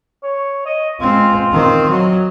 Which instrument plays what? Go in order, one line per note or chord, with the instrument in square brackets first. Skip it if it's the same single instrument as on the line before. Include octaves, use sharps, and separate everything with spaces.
[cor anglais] C#5
D#5
[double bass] G#3 C4 [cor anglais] F4
[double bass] D#3 C4
[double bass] F#3 [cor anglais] D#5